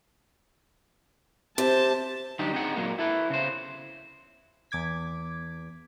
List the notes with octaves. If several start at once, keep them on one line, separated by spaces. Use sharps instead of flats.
C3 C5 A5
D3 F#3 G3 D4 D#4 G4
C4 D#4 G#4 F#5
A#2 F#3 G#3 A#3
E4 A4 B4
C#3 C5
E2 D6 G#6 B6